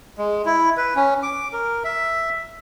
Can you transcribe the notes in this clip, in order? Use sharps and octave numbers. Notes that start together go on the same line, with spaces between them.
G#3
E4
B4
C#4
D6
A#4
E5